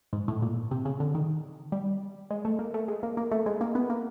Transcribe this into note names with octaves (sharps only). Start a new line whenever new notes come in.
G#2
A2
A#2
C3
C#3
D3
D#3
G3
G#3
A3
A#3
A3
G#3
A#3
A#3
A3
G#3
A#3
B3
A#3